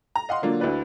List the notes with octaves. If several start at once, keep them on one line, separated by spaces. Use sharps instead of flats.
A#5
D#5 F5 F#5 C6
D3 F#3 A#3 D4 F4
D2 E4 F#4 B4 D5